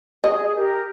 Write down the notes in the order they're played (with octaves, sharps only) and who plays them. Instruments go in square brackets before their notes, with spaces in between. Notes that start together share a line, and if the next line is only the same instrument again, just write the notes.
[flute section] G#4 [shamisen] D#5
[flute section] G4 A#4